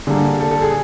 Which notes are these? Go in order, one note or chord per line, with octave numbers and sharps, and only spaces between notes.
D3 G3 A#3 G#4
A4
A4
G#4